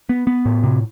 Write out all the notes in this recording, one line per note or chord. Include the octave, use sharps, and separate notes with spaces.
B3
B3
A2
C3